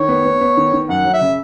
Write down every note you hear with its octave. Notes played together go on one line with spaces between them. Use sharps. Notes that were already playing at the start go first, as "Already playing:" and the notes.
Already playing: D#3 C#5
B3
B3
B3
D#3
D#3
F#2 F#5
F#3
E5
C#3